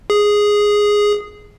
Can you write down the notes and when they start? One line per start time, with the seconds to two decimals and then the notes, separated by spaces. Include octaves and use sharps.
0.10 G#4